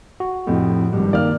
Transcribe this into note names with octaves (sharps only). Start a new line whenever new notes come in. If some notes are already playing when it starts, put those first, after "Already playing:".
F#4
F2 A2 C3
G#1 G2
D#3 A#3 D5 F6